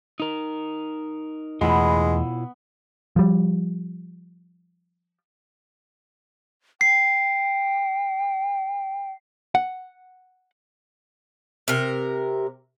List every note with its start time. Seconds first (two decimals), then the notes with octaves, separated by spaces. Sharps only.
0.20 D#4 A#4
1.61 E2 B2 G#3 A3 B3 E4 F4 B5
3.16 F3 G3
6.81 G5 C7
9.55 F#5
11.68 C3 A#4